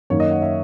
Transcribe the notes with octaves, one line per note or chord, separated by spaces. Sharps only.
F#2 D#3 A#3 D#4 C#5
D#5
F#5
E5